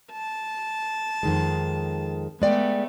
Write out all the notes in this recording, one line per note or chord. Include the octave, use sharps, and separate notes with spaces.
A5
F2 D#3 G#3
G#3 A3 B3 D5 G5